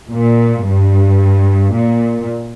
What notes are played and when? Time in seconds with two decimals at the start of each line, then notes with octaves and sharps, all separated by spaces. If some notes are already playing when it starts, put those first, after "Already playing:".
0.11 A#2
0.65 G2
1.75 A#2